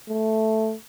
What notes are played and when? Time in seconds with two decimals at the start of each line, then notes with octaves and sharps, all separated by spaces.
0.09 A3